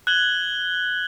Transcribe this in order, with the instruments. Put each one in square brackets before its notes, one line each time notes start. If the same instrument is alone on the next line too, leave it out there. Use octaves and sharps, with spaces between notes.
[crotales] F#6 G#6 F#7 G7